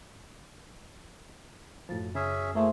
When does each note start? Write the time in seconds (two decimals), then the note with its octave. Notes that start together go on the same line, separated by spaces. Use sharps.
1.89 F#2 A2 F3 A6
2.15 F#2 C#3 C#4 G#4 E5
2.55 A3 A#3 E4 G#4 C5 C6